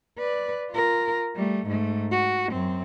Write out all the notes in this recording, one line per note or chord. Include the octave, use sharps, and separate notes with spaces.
B4 D5
F4 A#4
G3 A3
G#2 A3
F#4
F#2 C4